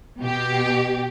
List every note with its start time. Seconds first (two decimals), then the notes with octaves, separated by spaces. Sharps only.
0.19 B2 G4